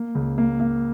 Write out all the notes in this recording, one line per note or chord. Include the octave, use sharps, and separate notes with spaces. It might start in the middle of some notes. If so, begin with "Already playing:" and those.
Already playing: A#3
C#2
A#3
A#3